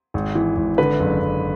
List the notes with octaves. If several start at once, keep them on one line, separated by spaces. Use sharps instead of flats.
G#1
E3
G#1
D3 B4
F#1
F#1